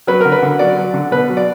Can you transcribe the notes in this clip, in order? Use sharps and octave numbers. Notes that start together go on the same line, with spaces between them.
F#3 B4
D3 A#4
B4
D3
F#3 D5
F#3
D3
B2 B4
F#3
D5